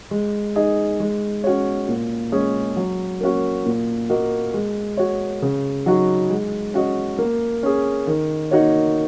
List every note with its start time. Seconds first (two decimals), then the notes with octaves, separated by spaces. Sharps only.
0.11 G#3
0.56 D#4 G#4 D#5
1.00 G#3
1.44 C#4 F#4 C#5
1.88 A#2
2.32 G#3 C#4 G#4
2.76 F#3
3.21 A#3 C#4 F#4
3.66 A#2
4.10 A#3 F#4 D#5
4.54 G#3
4.97 F#4 C#5
5.42 C#3
5.86 F#3 D#4 F#4
6.30 G#3
6.74 C#4 F#4 D#5
7.19 A#3
7.63 C#4 G#4
8.07 D#3
8.51 A#3 D#4 F#4 C#5